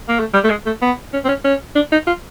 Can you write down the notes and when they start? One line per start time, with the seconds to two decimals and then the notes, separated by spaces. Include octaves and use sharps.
0.09 A#3
0.19 A3
0.34 G3
0.44 A3
0.50 G#3
0.66 A3
0.82 B3
1.13 C#4
1.24 C4
1.29 C#4
1.44 C#4
1.76 D4
1.92 D#4
2.07 F4